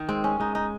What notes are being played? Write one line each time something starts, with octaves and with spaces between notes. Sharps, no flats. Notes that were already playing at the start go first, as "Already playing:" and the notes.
Already playing: D#3
G#3 C4
C#4
G#3 D#4
D#4